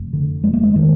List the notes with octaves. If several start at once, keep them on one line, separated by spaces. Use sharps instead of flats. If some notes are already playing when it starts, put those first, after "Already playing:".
Already playing: F1
D3
F2 G#3
A#3
G#3
D#3